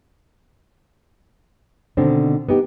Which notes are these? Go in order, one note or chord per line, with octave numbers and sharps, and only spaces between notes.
B2 D3 D#3 C4 D4
B3 D#4 G4